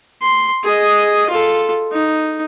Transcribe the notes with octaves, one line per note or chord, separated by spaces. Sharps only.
C6
G#4 D#5
F4 A4
D#4